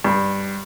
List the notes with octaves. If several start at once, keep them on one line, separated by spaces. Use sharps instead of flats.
G2